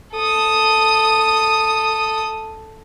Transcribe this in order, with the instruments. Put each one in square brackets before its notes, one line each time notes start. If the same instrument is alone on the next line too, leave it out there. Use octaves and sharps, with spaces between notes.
[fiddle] A4 D#6